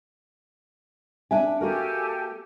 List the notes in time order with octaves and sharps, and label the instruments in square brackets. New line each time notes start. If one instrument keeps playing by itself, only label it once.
[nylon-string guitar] D4 E5 G#5
[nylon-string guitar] A#3 F#4 A#4 [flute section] G4 A4 G#5